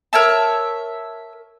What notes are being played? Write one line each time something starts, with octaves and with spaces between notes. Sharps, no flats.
A#4 C#5 E5 A5